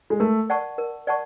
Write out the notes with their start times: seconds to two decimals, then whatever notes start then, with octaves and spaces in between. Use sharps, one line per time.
0.10 G#3
0.20 A3 A#4
0.50 D5 F#5 A5 C#6
0.78 A#4
1.07 D5 F#5 A5 C#6